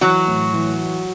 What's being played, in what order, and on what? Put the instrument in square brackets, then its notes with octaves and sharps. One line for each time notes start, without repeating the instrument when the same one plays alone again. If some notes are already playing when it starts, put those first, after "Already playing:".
[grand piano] E3 [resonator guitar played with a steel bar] F#3 F#4
[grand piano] A2
E3